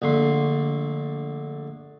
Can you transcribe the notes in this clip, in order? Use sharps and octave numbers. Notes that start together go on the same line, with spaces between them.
A#1 D3 A3 C6